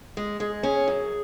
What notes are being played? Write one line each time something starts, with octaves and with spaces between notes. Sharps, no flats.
G#3
G#3 G#4
C#4 G#4
F#2